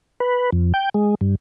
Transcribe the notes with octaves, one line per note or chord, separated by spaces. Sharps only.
B4
F2
G5
G#3
G2